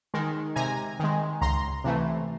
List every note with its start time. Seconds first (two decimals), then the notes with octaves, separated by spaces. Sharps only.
0.14 D#3 G#3
0.56 C3 G#5 A#5
1.00 D#3 G#3
1.41 C#2 A#5 C6
1.84 C3 E3 A3